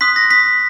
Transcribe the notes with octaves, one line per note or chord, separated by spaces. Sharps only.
C6 D#6 F#6 B6
A#6
B6